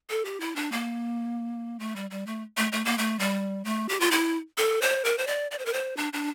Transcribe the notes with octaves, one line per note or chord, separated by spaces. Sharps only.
A4
G4
E4
D4
A#3
A3
G3
G3
A3
A3
A3
A#3
A3
G3
A3
G4
F4
E4
A4
C5
A#4
C5
D5
D5
C5
A#4
C5
D4
D4